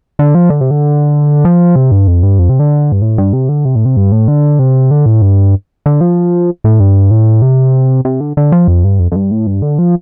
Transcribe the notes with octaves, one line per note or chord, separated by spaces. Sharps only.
D3
F3
D3
C3
D3
F3
C3
G2
F2
G2
F2
C3
D3
G2
A2
G2
C3
D3
C3
A2
C3
G2
A2
D3
C3
D3
A2
G2
D3
F3
A2
G2
A2
C3
C3
D3
D3
F3
F2
G2
F2
F2
G2
A2
G2
D3
F3